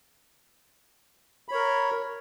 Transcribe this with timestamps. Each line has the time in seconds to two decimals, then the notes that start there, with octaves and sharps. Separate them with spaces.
1.49 B5
1.51 C#5
1.54 A#4